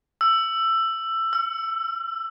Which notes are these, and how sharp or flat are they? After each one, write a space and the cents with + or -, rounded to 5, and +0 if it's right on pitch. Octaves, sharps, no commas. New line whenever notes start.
E6 +15
E6 +45